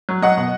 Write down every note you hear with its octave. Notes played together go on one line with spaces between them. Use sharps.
F#3
F#3 D#5 F#5
B2